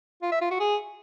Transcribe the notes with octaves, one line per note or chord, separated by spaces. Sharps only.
F4
E5
F4
F#4
G#4